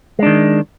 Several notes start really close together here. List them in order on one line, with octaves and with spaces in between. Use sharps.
G#3 D4 D#3